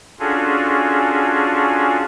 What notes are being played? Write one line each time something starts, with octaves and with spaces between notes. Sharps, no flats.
C#4 D4 F4 F#4 G#4 A4